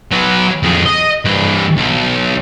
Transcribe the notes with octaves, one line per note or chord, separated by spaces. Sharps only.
F#3 B4
F2 G#4
D#5
G2 E3
B1